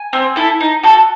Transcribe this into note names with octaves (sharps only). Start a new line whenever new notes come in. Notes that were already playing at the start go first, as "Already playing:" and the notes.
Already playing: G#5
C4
E4 A4
D#4
F#4 A4